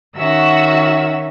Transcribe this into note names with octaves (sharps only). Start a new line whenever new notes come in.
D#3 C#4 F#4 E5 E6